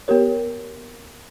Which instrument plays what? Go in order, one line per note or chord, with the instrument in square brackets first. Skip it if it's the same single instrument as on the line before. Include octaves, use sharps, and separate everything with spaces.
[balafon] B3 G4 A#4 C#5